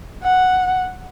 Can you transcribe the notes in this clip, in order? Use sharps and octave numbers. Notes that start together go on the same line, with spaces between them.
F#5